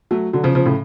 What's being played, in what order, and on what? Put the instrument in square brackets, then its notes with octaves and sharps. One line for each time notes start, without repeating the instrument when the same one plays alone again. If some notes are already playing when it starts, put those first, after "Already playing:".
[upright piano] F#3 A3
D3 F#3
C#3 F3
C#3 F3
A2 C#3